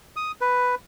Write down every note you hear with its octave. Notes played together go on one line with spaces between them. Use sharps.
D#6
B4